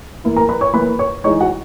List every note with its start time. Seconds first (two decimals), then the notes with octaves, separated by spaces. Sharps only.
0.24 E3 A#3 E4
0.36 A#4 A#5
0.49 B4 B5
0.61 C#5 C#6
0.74 E3 A#3 E4 B4 B5
0.99 C#5 C#6
1.24 E3 G#3 D#4 C#5 C#6
1.40 F#4 F#5